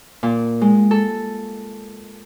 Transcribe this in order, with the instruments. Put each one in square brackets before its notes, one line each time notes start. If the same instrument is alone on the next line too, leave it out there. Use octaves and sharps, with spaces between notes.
[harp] A#2
G#3
A4